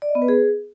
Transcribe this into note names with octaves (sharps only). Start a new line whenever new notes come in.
D5
D#5
B3
B4
G#4